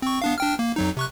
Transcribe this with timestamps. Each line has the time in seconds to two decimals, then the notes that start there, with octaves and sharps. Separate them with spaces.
0.02 C4 C#6
0.22 B3 D4 F5
0.38 D4 G5 F6
0.59 A#3
0.76 F2 F#3 D#4
0.97 C3 C#6 F#6